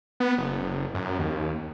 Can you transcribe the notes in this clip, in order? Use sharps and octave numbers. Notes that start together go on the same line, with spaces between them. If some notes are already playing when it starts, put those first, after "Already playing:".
B3
F#1
F#2
D#2